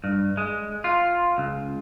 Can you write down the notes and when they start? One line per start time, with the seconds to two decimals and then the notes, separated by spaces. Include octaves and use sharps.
0.04 G2
0.37 G#3
0.84 F4
1.38 C#2